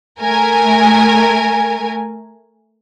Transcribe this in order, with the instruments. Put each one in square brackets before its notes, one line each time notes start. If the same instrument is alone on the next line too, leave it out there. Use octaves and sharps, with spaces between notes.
[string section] A3 A#4 G#5